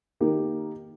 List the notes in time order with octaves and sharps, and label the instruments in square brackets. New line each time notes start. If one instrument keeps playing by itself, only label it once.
[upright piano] D#3 A#3 D#4 G4 A#4